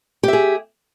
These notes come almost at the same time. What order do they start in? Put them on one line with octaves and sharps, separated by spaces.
G4 E5 G#4